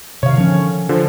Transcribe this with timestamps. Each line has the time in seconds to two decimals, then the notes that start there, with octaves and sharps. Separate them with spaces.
0.23 C3 D#3 C#5 F5
0.38 D3 F3 C#4
0.89 D3 F3